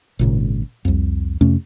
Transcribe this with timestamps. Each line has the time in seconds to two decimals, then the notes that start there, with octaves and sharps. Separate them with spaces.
0.19 G#1 A#2 C#3
0.85 C2 F2
1.41 F2 C3 A3 C#4